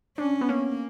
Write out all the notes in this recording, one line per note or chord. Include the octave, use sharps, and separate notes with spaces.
C#4 D4
B3
A#3 C#4